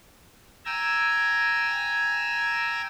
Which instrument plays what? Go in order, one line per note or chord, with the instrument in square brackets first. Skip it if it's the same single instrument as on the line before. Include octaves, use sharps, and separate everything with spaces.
[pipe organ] G5 G#5 A#5 E6